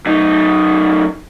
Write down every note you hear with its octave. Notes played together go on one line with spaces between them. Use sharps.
F#2 D#4